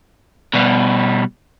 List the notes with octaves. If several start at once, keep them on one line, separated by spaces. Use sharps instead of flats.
B2 G3